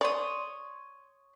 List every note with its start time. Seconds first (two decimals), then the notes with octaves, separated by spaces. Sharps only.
0.01 C#5 D5 C6 D#6